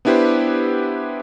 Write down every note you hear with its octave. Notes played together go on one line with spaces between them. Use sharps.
B3 D4 E4 G4 B4 C5